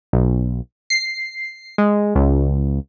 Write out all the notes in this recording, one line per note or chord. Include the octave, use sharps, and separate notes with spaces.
B1
C7
G#3
C#2